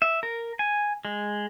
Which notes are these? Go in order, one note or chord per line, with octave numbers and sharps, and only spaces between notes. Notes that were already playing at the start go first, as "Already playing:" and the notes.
E5
A#4
G#5
G#3